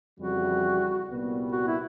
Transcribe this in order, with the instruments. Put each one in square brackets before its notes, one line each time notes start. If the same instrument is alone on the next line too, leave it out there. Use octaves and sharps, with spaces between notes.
[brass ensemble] F2 C#3 E3 G3 [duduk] F#4
[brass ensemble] C2 A#2 G3 B3
[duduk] F#4
E4